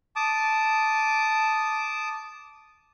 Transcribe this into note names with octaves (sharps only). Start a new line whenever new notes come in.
A5 D6 D#6